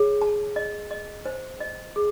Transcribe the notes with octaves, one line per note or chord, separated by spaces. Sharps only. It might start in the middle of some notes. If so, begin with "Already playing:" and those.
Already playing: G#4 C#5
A5
D#5
D#5
C5
D#5
G#4